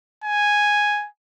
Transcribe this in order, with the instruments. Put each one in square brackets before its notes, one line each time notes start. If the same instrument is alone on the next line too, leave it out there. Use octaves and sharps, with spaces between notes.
[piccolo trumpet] G#5